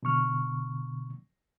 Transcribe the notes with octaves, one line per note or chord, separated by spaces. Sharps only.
B2 D3 C#6 F6